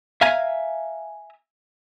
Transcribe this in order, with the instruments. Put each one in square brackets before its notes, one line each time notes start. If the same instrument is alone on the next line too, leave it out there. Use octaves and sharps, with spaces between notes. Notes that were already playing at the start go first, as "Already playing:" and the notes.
[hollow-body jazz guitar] E5 F5 G#5 A#5